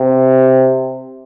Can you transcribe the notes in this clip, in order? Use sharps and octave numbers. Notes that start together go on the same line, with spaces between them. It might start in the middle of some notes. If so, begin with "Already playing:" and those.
Already playing: C3